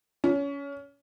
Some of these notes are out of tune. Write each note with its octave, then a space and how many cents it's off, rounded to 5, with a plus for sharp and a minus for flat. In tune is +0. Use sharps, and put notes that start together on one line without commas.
C#4 +25